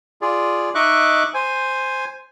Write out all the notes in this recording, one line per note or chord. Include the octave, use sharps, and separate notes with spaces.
F4 G#4 D5
D#4 D#5 E5 C#6 D6 F#6
C5 G#5